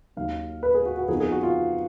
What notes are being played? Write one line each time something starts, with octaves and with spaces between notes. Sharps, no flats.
D#2 D#3 F#3 F5
B4
G#4
F#4
F#4
F2 F3 B3 D#4 G#4
G#4
F#4
F4